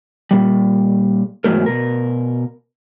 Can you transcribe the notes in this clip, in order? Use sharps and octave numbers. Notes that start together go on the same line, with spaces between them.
A#2 G3
E2 G#2 D#3 F#3 A3 A#4
B2 A#4